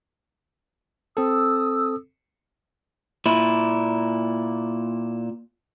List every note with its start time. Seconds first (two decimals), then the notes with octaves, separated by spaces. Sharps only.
1.17 C4 A4 D#6 E6
3.26 A#2 E4